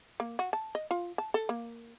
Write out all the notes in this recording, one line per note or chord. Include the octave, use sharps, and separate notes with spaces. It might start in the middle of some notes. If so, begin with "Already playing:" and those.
A#3
F#4
A5
D#5
F4
A5
A4
A#3